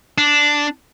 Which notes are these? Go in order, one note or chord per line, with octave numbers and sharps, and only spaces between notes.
D4